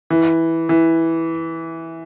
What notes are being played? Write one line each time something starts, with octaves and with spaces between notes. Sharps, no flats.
E3
E3